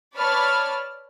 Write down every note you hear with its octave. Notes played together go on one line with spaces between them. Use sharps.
B4 C#5 D5 A5 B5 F6